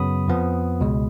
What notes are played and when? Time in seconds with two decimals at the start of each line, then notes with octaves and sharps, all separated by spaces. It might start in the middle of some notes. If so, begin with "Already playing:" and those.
Already playing: F#2 C#3 F#3 B3 B5 D#6
0.28 F2 F3 B3
0.80 C#2 B2 G#3